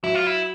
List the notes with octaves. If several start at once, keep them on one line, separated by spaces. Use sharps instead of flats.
F#3 E4
F4
E4